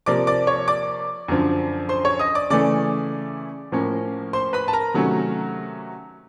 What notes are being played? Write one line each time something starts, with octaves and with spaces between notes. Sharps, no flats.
C3 F3 A#3 D5 D6
D5 D6
C#5 C#6
D5 D6
F#2 D3 F3
C5 C6
C#5 C#6
D#5 D#6
D5 D6
C#3 E3 A3 C#4 D5 D6
A2 F3 A#3 C#4
C5 C6
B4 B5
A5
A#4 A#5
C3 D#3 F#3 A3 C#4